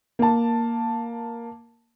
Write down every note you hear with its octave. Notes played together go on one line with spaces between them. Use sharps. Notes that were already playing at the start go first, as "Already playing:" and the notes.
A#3 A5